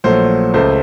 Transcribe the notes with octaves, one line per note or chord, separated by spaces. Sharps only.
A#1 A#2 F#3 A3 C5
C#2 C#3 A3 C5